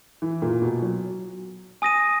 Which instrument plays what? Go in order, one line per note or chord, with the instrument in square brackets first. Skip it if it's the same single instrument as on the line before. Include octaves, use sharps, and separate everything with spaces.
[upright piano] E3
A#2
B2
F#3
[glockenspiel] G#5 D#6 A#6 D#7